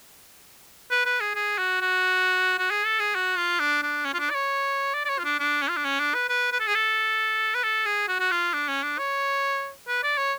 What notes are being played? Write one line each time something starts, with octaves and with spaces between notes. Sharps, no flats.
B4
B4
G#4
G#4
F#4
F#4
F#4
G#4
A4
G#4
F#4
F4
D4
D4
C#4
F4
D4
D5
C#5
D5
D5
C#5
F4
D4
D4
C#4
F4
D4
C#4
D4
B4
B4
B4
A4
G#4
A4
B4
A4
G#4
F#4
F#4
F4
D4
C#4
D4
C#5
B4
D5
C#5